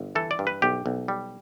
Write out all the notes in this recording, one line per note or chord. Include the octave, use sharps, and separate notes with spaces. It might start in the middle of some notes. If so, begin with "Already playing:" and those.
Already playing: G1
E3 A4
D5
G2
B4
B1 G4
B1
G3